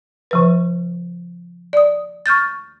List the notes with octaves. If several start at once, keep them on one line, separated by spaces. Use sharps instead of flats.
C#3 F3 B4
D5 D#6
C#6 F6 G6 A6